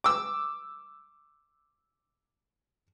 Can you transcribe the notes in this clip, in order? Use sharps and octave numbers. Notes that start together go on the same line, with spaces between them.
D6 E6